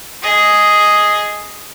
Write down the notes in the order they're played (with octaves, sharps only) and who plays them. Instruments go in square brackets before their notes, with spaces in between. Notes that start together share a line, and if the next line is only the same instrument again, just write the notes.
[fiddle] G#4 D#5